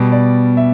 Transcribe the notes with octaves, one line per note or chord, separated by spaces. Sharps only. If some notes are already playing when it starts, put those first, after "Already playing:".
Already playing: B2 G3
D5
E5